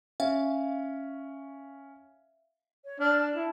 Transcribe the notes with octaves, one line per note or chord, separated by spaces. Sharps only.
C#4 E5 F5
C#5
D4 F6
A5
E4